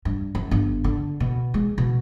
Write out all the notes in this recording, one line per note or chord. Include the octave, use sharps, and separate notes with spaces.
G2
F#2
G1
D3
B2
G#3
B2